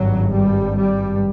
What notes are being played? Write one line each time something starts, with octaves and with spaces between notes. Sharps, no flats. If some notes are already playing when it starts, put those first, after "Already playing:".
Already playing: G#1 G2 F#3
G3
G3